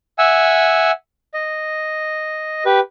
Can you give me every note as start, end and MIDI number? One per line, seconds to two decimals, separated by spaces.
0.18 0.91 76
0.18 0.91 78
0.18 0.91 80
0.18 0.91 88
1.34 2.64 75
2.65 2.80 67
2.65 2.80 71